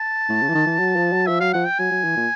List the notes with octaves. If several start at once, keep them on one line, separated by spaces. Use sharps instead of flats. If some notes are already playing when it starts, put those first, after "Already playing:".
Already playing: A5
A2
C#3
E3
D#3
E3
F#3
F3
F#3
F3 E5
F#3 F5
F3 F#5
G5
F#3 G#5
F#3
E3
A#2